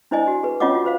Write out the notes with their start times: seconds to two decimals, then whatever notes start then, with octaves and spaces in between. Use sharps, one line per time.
0.11 D4 E4 C5 D5 D#5 G#5
0.27 F#4
0.43 G#4 B4
0.60 C#4 F4 C#5 D#5 F#5 D6
0.73 F4 F#4
0.85 B4 C5 F5